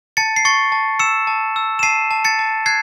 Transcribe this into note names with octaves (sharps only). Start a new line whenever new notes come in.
A5 A6 C#7
C7
C#6 A6 C#7
A5
E6 C#7 E7
A5
E6
E7
A5 C7 D#7
A5
A6 C#7
A5
F#6 G#6 C7